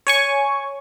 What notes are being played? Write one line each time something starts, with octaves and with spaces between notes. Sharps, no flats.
C#5 G#5 C#6